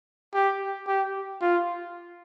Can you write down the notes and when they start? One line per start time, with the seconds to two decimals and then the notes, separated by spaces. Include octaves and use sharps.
0.35 G4
0.87 G4
1.42 F4